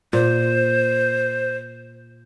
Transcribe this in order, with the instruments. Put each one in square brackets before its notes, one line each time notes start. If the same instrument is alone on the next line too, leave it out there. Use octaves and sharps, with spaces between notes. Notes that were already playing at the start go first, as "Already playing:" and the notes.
[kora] A#2 [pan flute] C5